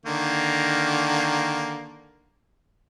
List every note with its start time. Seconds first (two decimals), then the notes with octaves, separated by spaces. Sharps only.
0.06 D3 D#3 A#3